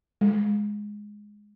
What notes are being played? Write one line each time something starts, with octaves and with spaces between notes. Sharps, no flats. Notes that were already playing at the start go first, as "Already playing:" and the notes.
G#3